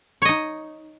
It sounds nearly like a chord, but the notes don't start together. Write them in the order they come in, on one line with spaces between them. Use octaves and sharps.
C#5 D#5 D#4